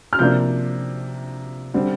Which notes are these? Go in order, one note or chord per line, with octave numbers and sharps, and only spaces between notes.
F6
C3 F3 A#3 D4 G6
D3 G3 C4